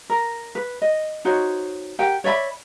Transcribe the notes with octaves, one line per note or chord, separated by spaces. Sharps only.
A#4
B4
D#5
D#4 F#4 C5 C#5
G4 A#4 F#5 G5
C#5 D5 E5 B5